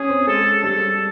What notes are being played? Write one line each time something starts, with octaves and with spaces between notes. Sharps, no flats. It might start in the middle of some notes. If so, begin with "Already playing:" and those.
Already playing: C#4 G#4
C4
G#3 A4
G3 A4